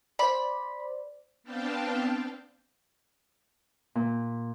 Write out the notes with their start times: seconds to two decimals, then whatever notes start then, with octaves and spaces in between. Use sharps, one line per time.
0.19 C5 D5 B5
1.43 B3 C4 D4 F5 G5 A5
3.95 A#2